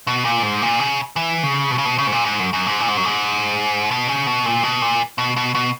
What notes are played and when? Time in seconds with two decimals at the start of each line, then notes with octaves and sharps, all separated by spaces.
0.07 B2
0.25 A#2
0.42 G#2
0.62 A#2
0.80 C#3
1.16 E3
1.43 C#3
1.71 B2
1.78 C#3
1.85 B2
1.98 C#3
2.07 G#2
2.12 A#2
2.25 G#2
2.39 F#2
2.53 F#2
2.67 G#2
2.80 A#2
2.88 G#2
2.97 F#2
3.05 G#2
3.91 B2
4.08 C#3
4.27 B2
4.46 A#2
4.63 B2
4.82 A#2
5.18 B2
5.36 B2
5.55 B2